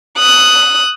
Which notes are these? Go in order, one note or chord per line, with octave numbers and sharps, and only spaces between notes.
D#6 F#6